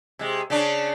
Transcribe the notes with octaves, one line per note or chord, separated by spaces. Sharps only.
C3 G#3
C#3 C#4 D4